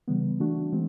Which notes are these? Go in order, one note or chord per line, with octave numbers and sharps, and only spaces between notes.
C#3 E3 G3 B3
E3 A3 D4 F#4
E3 G#3 C4